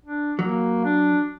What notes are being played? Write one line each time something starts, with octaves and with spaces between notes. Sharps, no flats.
D4
F#3 A#3
D4